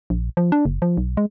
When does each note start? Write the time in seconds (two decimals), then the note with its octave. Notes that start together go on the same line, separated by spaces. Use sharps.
0.10 A#1
0.37 F3
0.52 D4
0.65 F#1
0.82 F3
0.98 B1
1.17 G#3